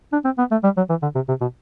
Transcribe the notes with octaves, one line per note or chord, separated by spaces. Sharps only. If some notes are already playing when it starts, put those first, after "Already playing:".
D4
C4
B3
A3
G3
F#3
E3
D3
C3
C3
B2